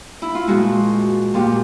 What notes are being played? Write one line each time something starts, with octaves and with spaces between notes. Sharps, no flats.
E4
F4
A#2 F3 G#3 F#4
A#2 F3 G#3 G4